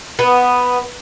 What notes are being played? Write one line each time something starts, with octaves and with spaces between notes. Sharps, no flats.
B3